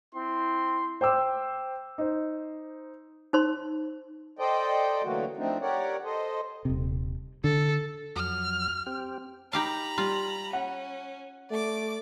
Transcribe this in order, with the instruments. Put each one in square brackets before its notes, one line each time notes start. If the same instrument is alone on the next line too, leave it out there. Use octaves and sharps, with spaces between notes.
[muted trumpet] C4 [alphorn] E4 [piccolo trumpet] C6
[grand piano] C5 G5 D6 E6
D#4 C5
[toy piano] D#4 C5 C6
[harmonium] A4 C5 D5 D#5 G5
D3 E3 F#3 A3 A#3 F#4
F3 A3 C4 D4 D#4
G4 A#4 C#5 D5 F#5
A4 C5 D#5
[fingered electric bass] D#1 C3
[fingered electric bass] D3 [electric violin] A4
[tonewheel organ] F2 F#3 [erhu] F6
[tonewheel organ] C4 G4
[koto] D#4 G4 F5 [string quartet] A#5 B5
[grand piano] G3 [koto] F4
[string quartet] C#4 [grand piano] F#5
[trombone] A3 [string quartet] D5 D6